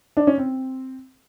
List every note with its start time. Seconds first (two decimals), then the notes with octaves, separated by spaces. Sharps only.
0.17 D4
0.27 C#4
0.38 C4